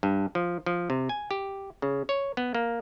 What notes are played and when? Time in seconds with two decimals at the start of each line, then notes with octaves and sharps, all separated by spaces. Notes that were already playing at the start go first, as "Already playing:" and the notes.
0.03 G2
0.35 F3
0.66 F3
0.90 C3
1.09 G#5
1.31 G4
1.82 C#3
2.09 C#5
2.37 B3
2.55 A#3